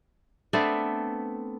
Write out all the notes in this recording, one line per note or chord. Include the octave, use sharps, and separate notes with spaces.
A3 B3 C4 D4